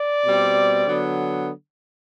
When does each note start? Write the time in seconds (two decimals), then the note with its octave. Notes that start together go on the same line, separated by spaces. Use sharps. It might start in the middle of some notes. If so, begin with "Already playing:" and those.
Already playing: D5
0.25 B2 G3 C4
0.87 D3 F#3 B3